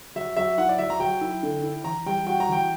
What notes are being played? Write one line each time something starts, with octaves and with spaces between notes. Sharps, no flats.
F#3 E5
F#3 E5
E4 F#5
D5
F#3 E5
A#5
F#3 G5
E4
D3
E4
E3 A#5
G3 G5
F#4 G5
A#5
E3 G5